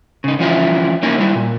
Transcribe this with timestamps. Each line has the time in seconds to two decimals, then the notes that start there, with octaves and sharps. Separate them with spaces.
0.24 C#3 D#4
0.39 D3 E3 F3 C#4 E4 F4
1.03 A#3 C#4 D#4 E4
1.18 F#3 G3 E4
1.35 A#2